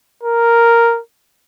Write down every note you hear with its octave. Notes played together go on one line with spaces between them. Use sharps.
A#4